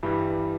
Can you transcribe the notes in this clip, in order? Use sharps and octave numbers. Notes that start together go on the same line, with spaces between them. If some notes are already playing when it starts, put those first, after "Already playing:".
G2 E3 G3